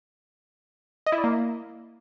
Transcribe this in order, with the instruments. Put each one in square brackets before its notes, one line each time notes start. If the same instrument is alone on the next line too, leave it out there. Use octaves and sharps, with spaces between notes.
[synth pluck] D#5
E4
D5
A#3